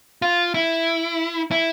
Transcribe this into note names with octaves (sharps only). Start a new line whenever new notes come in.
F4
E4
E4